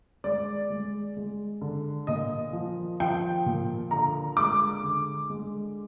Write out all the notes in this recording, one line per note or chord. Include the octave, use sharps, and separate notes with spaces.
G#3 D5
G#3
G#3
D3
A#2 D#5
F3
F3 G5
A#2
D3 A#5
G#3 D6
D3
G#3